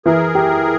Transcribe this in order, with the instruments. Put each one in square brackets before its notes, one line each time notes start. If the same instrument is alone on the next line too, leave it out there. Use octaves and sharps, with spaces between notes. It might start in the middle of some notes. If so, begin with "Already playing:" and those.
[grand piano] E3 [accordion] G#4 A#4
[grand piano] G4